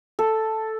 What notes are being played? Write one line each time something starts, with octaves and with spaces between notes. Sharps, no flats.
A4